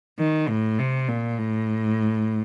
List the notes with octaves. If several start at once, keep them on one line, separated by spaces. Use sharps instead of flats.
D#3
A2
C3
A#2
A2